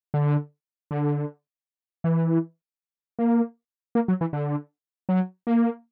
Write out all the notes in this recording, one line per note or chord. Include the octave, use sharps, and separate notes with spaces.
D3
D3
E3
A#3
A#3
F#3
E3
D3
F#3
A#3